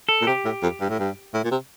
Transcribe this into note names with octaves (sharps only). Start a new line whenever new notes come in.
A4
A#2
C3 G4
A2
F2
G2
A2
G2
A2
A#2
C3